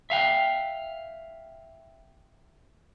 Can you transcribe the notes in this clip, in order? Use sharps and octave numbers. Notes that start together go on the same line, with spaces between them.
E5 F5 G5